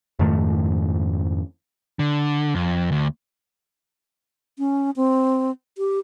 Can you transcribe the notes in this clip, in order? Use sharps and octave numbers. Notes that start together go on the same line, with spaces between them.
F2 G#2 D#3 A3
D3
F2
D2
C#4
C4
G4